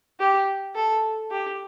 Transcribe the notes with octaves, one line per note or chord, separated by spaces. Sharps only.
G4
A4
G4